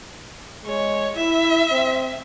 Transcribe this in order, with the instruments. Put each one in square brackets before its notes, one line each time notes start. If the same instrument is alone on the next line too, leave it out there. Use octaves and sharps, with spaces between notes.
[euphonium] G#3 [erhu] C#5
[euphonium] E4 [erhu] E5
[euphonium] C4